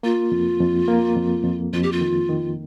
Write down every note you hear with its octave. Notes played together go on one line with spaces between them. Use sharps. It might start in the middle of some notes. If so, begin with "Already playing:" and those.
A#3 F4
F2
F2
A#3
F2
F2
F2 F4
G4
F4
D#3
D#3